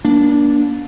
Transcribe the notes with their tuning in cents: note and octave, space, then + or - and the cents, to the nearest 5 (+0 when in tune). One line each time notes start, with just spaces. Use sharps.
A#3 +35 D4 -15